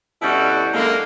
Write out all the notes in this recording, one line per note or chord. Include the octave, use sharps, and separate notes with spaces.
B2 D3 G3 C#4 E4 F#4
F#2 A2 D3 G#3 A#3